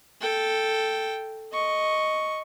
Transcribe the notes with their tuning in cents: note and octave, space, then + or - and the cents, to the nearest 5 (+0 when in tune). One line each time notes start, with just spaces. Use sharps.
A4 +0 G5 +0
D#5 +0 C#6 +0